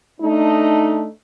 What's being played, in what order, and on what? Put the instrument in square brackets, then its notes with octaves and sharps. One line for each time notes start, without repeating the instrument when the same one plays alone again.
[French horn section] A3 D4 D#4